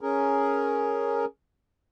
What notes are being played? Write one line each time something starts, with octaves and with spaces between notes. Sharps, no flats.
C#4 G#4 A#4